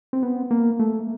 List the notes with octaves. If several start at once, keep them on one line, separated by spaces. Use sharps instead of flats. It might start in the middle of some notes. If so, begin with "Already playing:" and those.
C4
B3
A#3
A3